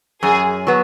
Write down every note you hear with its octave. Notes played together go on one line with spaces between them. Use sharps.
F#2 G#4
F#3 B3